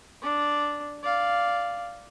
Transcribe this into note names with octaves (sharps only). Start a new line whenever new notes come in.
D4 D5
D5 F5